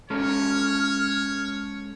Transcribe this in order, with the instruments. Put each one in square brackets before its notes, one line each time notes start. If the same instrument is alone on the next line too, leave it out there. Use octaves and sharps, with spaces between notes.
[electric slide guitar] G#3 C#4 A4 [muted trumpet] C#5 [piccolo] F6